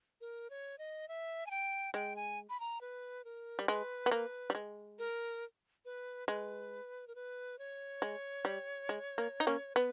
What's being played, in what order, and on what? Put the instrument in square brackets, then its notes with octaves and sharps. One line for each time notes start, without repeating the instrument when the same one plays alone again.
[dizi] A#4
C#5
D#5
E5
G#5
G5
[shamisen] G#3 [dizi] G5
[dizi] G#5
B5
A#5
B4
A#4
[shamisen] G3
[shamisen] G#3 [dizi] B4
[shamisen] B3
[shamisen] A#3 [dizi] B4
[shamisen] G3
G#3
[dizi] A#4
B4
[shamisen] G#3 [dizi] B4
[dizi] A#4
B4
C#5
[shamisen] G#3
G3
G#3
A#3
D#4
A#3 C#4
[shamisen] B3 [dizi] B4